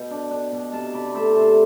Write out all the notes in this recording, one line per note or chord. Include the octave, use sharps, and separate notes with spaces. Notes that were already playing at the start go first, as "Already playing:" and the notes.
Already playing: B2 G5
D4
D4
B2
C3 F5 A5
C3 B4 D5
A3 C5 E5
C3 A4 C5